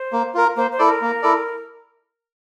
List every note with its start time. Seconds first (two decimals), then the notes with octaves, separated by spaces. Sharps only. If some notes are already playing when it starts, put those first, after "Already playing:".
Already playing: C5
0.13 A#3
0.35 F4 A#4
0.57 A#3 C5
0.72 C5
0.79 E4 A4 D5
0.86 A#4
1.02 A#3
1.22 E4 A4 D5